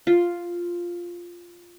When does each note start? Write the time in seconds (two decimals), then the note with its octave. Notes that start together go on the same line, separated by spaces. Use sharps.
0.07 F4